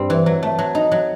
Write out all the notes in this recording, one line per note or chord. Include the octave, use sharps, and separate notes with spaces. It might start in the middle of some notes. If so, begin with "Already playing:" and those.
Already playing: G2 G3 C4
E3
F#3
A3
F#3
D#4
F#3